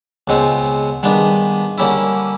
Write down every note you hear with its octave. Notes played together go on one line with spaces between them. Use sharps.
C#2 B2 G#3 C4
G2 D#3 G#3 B3 D4
D3 G3 A#3 C#4 E4